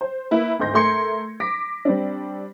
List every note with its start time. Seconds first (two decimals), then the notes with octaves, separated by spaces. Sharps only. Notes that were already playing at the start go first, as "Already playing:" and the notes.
0.01 C5
0.31 A#3 E4 B4
0.59 G#1 D2 D#5 C6 G6 A#6
0.74 A3 A#4 C6 G#6 C#7
1.40 D6 A#6 B6 D7
1.85 G3 C4 D4